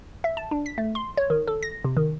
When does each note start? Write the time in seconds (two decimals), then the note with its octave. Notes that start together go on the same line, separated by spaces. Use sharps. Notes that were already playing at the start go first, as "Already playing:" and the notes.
0.24 E5
0.37 A5
0.51 D4
0.66 B6
0.78 A3
0.95 C6
1.17 C#5
1.30 D#3
1.47 A4
1.63 A#6
1.84 C3
1.97 D#3